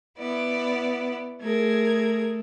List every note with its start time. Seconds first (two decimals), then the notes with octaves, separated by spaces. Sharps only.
0.18 B3 E4 D5
1.42 A3 G#4 A#4 G#6